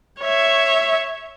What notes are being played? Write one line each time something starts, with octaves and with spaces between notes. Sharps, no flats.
C#5 E5